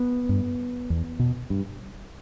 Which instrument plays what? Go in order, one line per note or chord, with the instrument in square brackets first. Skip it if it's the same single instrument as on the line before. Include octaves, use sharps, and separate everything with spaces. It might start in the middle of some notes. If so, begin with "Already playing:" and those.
Already playing: [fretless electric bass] B3
G2
E2
B2
G2